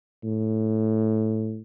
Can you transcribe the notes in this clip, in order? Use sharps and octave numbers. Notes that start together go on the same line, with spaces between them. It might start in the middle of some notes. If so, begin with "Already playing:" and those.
A2